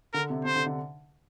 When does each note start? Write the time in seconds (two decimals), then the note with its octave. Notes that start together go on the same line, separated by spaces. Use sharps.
0.13 D3 A#4
0.30 C3
0.45 C3 C5
0.56 D3
0.66 D3